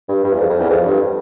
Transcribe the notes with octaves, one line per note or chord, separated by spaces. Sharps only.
G2
G2
E2
F2
F2
E2
F2
G2